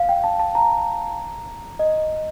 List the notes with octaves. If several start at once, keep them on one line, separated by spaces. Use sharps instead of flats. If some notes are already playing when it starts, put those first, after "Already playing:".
Already playing: F5
G5
A5
A5
A#5
D#5